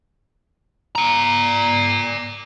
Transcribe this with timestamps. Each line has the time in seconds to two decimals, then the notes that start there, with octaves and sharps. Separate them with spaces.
0.96 D5 A#5